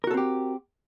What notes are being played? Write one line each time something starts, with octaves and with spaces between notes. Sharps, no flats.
C4 F#4 G4 A4 A#4